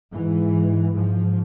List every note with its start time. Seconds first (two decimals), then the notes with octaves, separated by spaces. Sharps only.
0.13 G#2 E3
0.95 G#2 F3